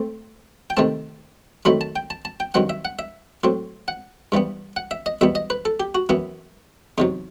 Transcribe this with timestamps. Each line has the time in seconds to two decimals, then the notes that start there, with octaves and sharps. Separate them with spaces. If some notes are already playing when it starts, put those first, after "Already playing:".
Already playing: A3 C4
0.70 G5
0.77 C3 D#3 A3 C4 A5
1.65 F#2 D#3 F#3 A3 C4 B5
1.81 A5
1.96 G5
2.10 A5
2.25 A5
2.40 G5
2.54 G2 D#3 F#3 C4 F#5
2.69 E5
2.85 F#5
2.99 E5
3.44 A2 F#3 C4
3.88 F#5
4.32 G2 E3 G3 B3
4.76 F#5
4.91 E5
5.06 D#5
5.21 E2 B2 G3 B3 E5
5.35 D#5
5.50 B4
5.65 A4
5.80 G4
5.95 F#4
6.09 F#2 E3 B3 E4
6.98 E2 C3 F#3 D#4